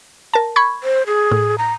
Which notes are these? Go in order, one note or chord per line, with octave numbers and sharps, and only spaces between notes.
A#4 A5
B5 C#6 G#6
C5
G#4
A2
A#5